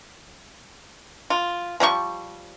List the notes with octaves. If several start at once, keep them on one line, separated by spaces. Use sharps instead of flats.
F4
F3 G3 F4 C#6